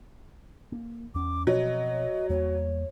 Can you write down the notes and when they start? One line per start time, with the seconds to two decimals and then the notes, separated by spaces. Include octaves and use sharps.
0.72 A#3
1.15 E2 C#4 D6
1.47 B2 F3 F#3 C4 D#5
2.29 E2 G3 A#3 C#5